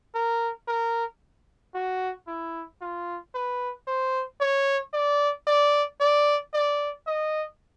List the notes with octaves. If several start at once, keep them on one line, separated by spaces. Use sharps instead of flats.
A#4
A#4
F#4
E4
F4
B4
C5
C#5
D5
D5
D5
D5
D#5